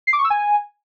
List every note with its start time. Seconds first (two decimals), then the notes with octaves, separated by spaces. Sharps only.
0.07 C7
0.13 D6
0.19 C#6
0.24 E6
0.30 G#5